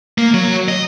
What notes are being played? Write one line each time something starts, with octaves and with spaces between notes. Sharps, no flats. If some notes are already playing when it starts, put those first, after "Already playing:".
A#3
F#3
D#5